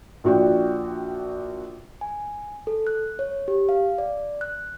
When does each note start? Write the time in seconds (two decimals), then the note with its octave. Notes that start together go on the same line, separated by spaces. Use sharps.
0.24 A#1 D4 F#4 D5 G5
2.01 G#5
2.67 A4
2.87 F#6
3.19 C#5
3.48 G4
3.69 F5
3.98 D5
4.41 F#6